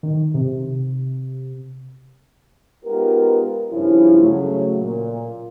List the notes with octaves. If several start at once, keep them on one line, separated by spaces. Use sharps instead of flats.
D#3
C3
G#3 B3 D#4 F4 G4 A#4
G2 C#3 F3 C#4 E4
C#3 F#3 A3
A#2